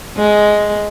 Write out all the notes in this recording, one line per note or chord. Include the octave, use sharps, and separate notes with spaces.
G#3